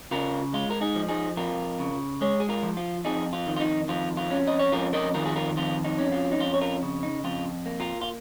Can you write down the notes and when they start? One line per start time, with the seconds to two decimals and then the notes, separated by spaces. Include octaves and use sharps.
0.11 C#3 F4 A#4
0.53 G#3 F4
0.70 A#4
0.81 D#4 G#4
0.95 F3
1.09 D#4 G#4
1.37 F2 F4 A#4
1.79 C#3
2.21 G#3 G#4 C#5
2.40 G#4
2.49 F4 A#4
2.63 F3
2.77 F4
3.05 F2 D#4 G#4
3.33 F4
3.47 D#3
3.56 F4
3.60 D#4
3.88 F2 F4
4.17 F4
4.31 C#4
4.47 D#5
4.59 C#5
4.72 F2 F4 A#4
4.93 A#4 D#5
5.14 D#3 F4 A#4
5.25 G#4
5.36 F4 A#4
5.56 F2 F4
5.85 D#4
5.99 C#4
6.12 F4
6.32 D#4
6.40 F2 F4
6.54 C#5
6.61 F4 A#4
6.82 C#3
7.03 D#4
7.24 F2 F4
7.66 A#3
7.80 F4 A#4
8.01 F4